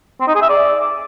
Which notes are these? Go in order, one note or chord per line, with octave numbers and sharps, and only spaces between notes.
C4
D#4
G#4
E5
D5